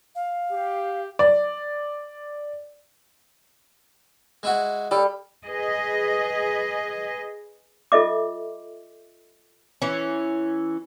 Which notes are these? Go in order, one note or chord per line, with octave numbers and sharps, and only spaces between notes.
F5
G4
D5
G#3 E4 F#4
G3 A4
G#4 B4 D#5
F4 A4 D#5 E5 D6
E3 C#4